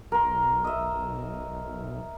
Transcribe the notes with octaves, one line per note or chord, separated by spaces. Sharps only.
B1 A#4 C6
D#5 E5